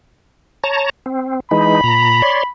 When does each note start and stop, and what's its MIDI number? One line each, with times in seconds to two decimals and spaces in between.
0.64 0.90 73
0.64 0.90 81
0.64 0.90 82
1.06 1.40 60
1.51 1.81 52
1.51 1.81 56
1.51 1.81 63
1.51 2.50 83
1.84 2.22 46
1.84 2.22 82
2.22 2.43 73
2.22 2.43 74
2.22 2.43 84